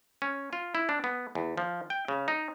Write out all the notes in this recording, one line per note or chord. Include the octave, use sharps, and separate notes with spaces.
C#4
F4
E4
D4
B3
E2
F3
G5
C#3
D#4